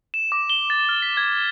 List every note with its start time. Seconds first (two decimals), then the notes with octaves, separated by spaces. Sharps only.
0.14 E7
0.32 D6
0.50 G7
0.70 A6
0.89 F6
1.02 B6
1.17 G#6